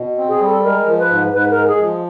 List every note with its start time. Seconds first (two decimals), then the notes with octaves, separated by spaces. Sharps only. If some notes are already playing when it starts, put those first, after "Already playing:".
Already playing: B2
0.18 C4
0.29 G#4
0.40 G3
0.46 A4
0.64 G#3 A#4
0.87 F3
0.99 B4
1.10 G#2
1.33 G#2 B4
1.50 A#4
1.57 G#3
1.68 G#4
1.80 F3